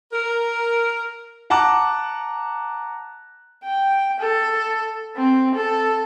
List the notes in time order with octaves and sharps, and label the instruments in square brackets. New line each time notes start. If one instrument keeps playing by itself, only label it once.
[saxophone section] A#4
[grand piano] F#5 A5 A#5 D6 F#6
[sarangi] G5
A4
C4
A4